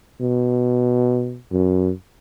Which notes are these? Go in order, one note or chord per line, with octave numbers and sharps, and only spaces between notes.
B2
F#2